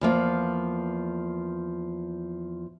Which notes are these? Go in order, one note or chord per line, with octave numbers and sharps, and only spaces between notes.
E2 F3 A#3